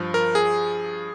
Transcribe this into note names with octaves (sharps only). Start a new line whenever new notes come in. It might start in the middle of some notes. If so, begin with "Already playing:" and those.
Already playing: G2 F3
A#4
G#4